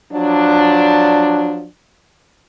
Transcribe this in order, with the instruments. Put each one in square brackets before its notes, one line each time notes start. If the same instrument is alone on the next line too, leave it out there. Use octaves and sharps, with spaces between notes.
[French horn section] F3 F#3 D4